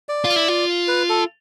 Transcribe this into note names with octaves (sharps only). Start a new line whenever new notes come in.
D5
F4
E4
F4
B4
A4